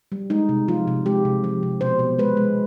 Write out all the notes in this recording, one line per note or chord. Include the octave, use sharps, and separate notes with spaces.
G3
G#3 D#4
C3
F3 F4
C3
G#3 G4
C3
F3
C3
B2 C5
B2
G#3 B4
G#3